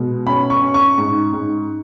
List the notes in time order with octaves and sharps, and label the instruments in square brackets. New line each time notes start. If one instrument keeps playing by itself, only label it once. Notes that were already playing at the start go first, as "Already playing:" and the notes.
Already playing: [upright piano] B2 G#3
C#4 B5
C#6
C#4
C#6
G#2
G#2